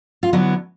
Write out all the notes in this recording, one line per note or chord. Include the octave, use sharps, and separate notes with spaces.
F4
D3 F#3 B3 E4